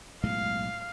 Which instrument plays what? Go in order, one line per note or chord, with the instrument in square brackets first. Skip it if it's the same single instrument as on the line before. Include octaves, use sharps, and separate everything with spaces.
[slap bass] B1 A2 G#3 [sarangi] F5